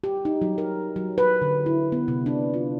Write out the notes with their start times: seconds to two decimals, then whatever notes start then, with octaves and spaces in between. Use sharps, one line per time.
0.04 G4
0.25 D#4
0.42 F#3
0.58 A#4
0.96 F#3
1.18 B4
1.42 D3
1.66 E4
1.92 B3
2.08 C3
2.26 D4
2.54 F4